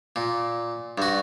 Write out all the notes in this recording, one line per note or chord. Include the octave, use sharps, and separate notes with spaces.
A#2
G2 F#4